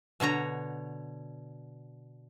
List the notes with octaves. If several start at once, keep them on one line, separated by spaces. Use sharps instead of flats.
B2 D3 C#5 A#5